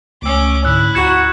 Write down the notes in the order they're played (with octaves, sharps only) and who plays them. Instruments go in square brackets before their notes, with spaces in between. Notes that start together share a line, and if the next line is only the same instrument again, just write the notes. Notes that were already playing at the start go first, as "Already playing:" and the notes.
[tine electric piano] C#2 A3 E6 [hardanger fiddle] C#4 D6
[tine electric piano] G#2 D3 [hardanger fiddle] E4 [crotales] E6 F#6
[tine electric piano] D2 A#5 [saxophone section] F#4 [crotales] G#6 C#7 E7